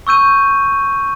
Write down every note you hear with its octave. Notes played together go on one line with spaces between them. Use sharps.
C#6 E6 G6 D#7